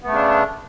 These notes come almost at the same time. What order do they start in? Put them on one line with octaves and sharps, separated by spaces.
B3 A3 C#3 D4